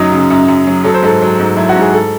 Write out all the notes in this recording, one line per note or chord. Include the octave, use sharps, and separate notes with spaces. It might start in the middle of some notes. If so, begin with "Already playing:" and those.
Already playing: F#2 F#3 D#4
C#3
F#2
F#2
F#3
F#3 A4
C5
G#2 A4
F#3
G#2
F#3 E4
F#4
G#2 G#4
A4